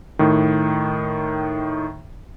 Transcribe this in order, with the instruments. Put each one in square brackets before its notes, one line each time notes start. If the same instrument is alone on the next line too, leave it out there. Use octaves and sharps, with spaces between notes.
[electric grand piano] A2 D#3